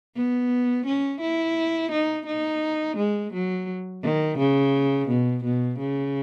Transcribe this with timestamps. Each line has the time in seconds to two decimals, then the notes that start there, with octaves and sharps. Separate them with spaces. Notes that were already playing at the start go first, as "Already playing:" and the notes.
0.16 B3
0.86 C#4
1.21 E4
1.91 D#4
2.26 D#4
2.97 G#3
3.33 F#3
4.03 D#3
4.38 C#3
5.09 B2
5.44 B2
5.79 C#3